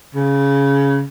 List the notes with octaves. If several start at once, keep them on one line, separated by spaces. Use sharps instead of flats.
C#3